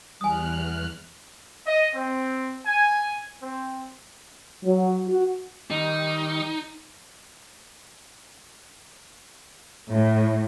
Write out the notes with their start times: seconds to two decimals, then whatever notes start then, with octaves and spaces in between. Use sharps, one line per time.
0.21 E2 G3 G#5 D#6 F6 F#6
1.65 D#5
1.95 C4
2.65 G#5
3.41 C4
4.64 F#3
5.08 F#4
5.70 D#3 G3 D#4
9.89 A2